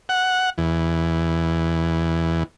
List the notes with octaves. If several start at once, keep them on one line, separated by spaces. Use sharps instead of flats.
F#5
E2